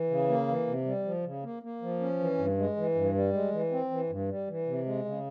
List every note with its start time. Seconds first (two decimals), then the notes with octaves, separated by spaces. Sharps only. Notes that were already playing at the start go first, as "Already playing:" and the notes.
Already playing: E3
0.10 C#3
0.29 A#3
0.48 E3
0.67 C3
0.86 G3
1.05 F3
1.24 C#3
1.43 A#3
1.63 A#3
1.82 F3
2.01 C#4
2.19 E3
2.38 G2
2.58 G#3
2.76 E3
2.95 G2
3.15 G3
3.33 G#3
3.52 E3
3.72 C4
3.91 E3
4.09 G2
4.29 G3
4.48 E3
4.67 C3
4.85 G#3
5.05 C#3